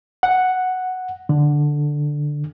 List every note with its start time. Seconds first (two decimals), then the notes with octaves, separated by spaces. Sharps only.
0.23 F#5
1.29 D3